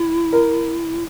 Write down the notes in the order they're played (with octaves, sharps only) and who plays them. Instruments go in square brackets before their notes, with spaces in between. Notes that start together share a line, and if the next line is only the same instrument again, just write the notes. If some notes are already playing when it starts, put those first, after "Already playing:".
Already playing: [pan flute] E4
[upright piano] A#4